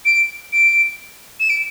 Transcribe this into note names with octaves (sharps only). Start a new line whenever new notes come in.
D7
D7
E7
D7